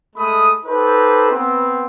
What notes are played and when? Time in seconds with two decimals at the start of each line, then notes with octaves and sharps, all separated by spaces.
0.16 G#3 A3 B5 D#6
0.65 D#4 G4 A4 B4 C5
1.29 B3 C4